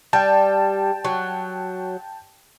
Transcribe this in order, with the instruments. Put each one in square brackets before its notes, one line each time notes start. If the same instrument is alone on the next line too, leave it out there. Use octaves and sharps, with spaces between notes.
[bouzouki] G3 [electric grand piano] G5 A5
[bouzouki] F#3